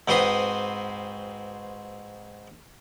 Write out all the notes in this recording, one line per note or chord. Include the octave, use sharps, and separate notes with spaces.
G#2 C4 F#4 B4 C6 D#6